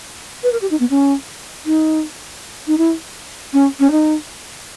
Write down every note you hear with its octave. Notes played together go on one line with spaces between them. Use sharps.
B4
A#4
G4
D#4
B3
C#4
D#4
D#4
E4
C#4
C#4
D#4